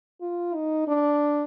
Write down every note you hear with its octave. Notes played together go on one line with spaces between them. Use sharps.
F4
D#4
D4